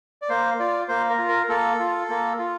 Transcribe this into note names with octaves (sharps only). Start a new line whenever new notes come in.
D5
A#3 C5
F4 D5
A#3 C5
A#4
F4
A#4
A#3 A4
F4
A#3
F4